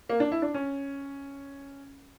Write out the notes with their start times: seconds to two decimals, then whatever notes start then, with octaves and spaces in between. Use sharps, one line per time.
0.10 A#3
0.20 D4
0.32 E4
0.42 D4
0.54 C#4